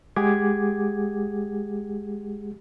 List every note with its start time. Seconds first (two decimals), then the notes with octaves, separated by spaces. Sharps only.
0.16 G#3 G4 G#4 F#5 D6 G#6